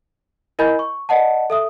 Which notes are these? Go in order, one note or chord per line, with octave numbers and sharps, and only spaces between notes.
E4 A#4 D#5 G#5 B5 G6
C#6
D5 D#5 F#5 A5
A4 E5 D#6